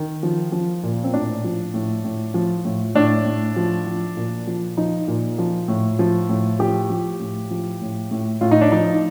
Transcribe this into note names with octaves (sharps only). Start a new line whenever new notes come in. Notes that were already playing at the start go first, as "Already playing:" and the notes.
Already playing: D#3
F3
F3
A#2
C4
A2 D4
F3
A2
A2
F3
A2
A2 D4
A2
F3
F3
A#2
F3
F3 D#4
A#2
F3
A2
F3
A2
F3 G4
F3
A2
F3
A2
A2
A2 F4
D#4
D4
F3 D#4